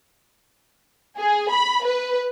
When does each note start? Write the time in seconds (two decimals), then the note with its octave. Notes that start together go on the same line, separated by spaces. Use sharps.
1.17 G#4
1.51 B5
1.84 B4